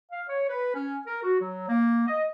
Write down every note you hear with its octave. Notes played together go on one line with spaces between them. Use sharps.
F5
C#5
B4
C#4
A#4
F#4
F#3
A#3
D#5